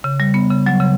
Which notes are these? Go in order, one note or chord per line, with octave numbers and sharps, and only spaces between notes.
C#3
G3
B3
C#3
F#3
C#3